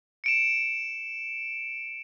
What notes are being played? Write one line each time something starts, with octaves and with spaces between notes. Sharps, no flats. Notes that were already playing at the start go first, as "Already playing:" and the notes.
C#7 D7 E7